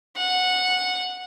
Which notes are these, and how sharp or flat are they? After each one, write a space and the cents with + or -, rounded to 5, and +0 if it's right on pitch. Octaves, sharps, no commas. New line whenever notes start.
F#5 -15